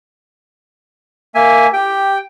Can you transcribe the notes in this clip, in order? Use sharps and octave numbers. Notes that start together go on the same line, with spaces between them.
A#3 E5 G#5
G4 G5